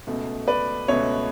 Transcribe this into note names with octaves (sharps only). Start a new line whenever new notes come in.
C#2 B2 A3
B4 D5
C#2 B2 A3 C#5 E5